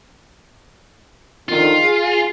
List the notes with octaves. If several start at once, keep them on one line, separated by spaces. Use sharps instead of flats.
F2 D3 D#3 F4
G#4